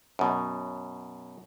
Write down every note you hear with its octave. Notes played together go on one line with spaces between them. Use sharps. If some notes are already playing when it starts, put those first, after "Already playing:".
F#2 B2